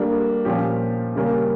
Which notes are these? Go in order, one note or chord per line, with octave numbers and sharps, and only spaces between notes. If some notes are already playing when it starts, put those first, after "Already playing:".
Already playing: G3 A#3 D4 A4
A#2 F3 C#4 G4
C#3 G3 A#3 C#4